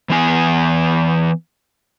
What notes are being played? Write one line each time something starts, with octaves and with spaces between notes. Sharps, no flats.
E3 B3 G#5